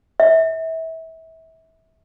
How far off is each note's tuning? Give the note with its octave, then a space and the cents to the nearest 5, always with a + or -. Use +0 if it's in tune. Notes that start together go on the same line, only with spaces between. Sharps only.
E5 -30